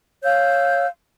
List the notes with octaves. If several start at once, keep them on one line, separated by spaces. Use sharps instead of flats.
C#5 F5 E6 G6